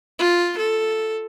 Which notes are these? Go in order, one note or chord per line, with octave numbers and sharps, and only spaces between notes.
F4
A4